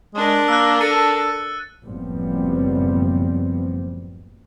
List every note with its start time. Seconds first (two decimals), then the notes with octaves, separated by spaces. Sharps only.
0.14 G#3 D4 A#4
0.48 A#3 E6 F#6
0.81 A4 A6 C#7 D#7
1.84 F#1 A2 F3 G3 B3 C4